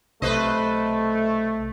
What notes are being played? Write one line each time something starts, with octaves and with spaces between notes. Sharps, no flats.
B1 C3 A3 B4 C5 D#5